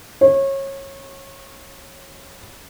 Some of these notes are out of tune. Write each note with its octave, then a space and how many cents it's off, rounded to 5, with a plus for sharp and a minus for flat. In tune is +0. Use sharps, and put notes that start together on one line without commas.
C#5 -25